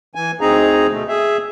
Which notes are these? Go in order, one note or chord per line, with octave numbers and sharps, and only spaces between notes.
E3 G#5
D2 C4 D#4 G#4 A#5
B2 A3
G#4 E5